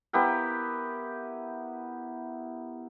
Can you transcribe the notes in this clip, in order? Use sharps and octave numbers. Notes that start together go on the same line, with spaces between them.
B3 E4 G4 A#4